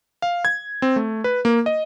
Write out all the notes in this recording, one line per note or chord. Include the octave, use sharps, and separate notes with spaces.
F5
G#6
C4
A3
B4
A#3
D#5